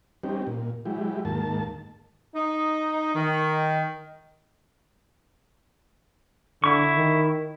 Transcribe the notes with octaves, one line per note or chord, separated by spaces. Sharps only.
G3 C4 C#4 D#4 G4
A#2
F#3 G#3 E4 G4
D#2 G#2 A#3 A5
D#4
D#3
D3 E4 C#6
D#3